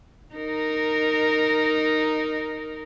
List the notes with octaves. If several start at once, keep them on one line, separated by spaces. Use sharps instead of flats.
D#4 A#4